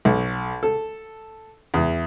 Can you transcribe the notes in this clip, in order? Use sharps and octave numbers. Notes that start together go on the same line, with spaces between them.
B1
A4
E2